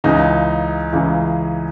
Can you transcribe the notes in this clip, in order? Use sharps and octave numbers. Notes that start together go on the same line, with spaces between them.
C#2 C#3 E3 D#4
C#2 C#3 E3